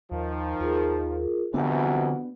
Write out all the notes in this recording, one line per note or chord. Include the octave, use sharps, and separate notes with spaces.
D#2 D#3 F3
D#2 F4 G#4 A#4
C2 F2 D3 E3 B3 D4 F#4 F#5